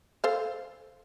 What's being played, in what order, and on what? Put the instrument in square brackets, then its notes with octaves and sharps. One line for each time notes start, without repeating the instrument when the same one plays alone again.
[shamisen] A4 C5 F5